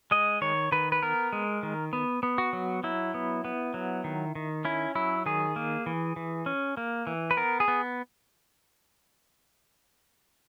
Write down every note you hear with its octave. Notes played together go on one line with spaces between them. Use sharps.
G#3 D#5
D#3 C#5
D#3 B4
B4
B3 A#4
G#3
D#3
B3
B3
F#4
F#3
F#3 E4
B3
B3
F#3
D#3
D#3
C#4 E4
F#3 E4
D#3 G#4
A#3
E3
E3
C#4
A#3
E3
B4
B3 A#4
G#4
B3